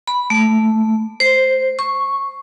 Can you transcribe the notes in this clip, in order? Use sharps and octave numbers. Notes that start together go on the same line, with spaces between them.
B5
A3
C5
C#6